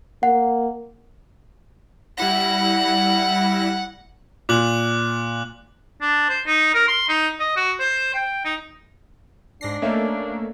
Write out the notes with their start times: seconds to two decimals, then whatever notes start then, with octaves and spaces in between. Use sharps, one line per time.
0.23 A#3 F#5
2.18 G3 E4 F#5 A#6
4.49 A#2 D6 F#6 F#7
6.01 D4
6.29 C5
6.47 D#4
6.75 A#4
6.88 C6
7.08 D#4
7.40 D#5
7.56 F#4
7.80 C5
8.14 G5
8.45 D#4
9.61 G#2 D4 A#6 C7
9.82 A3 A#3 C#4 D#5 E5